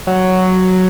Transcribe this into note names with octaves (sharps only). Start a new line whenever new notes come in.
F#3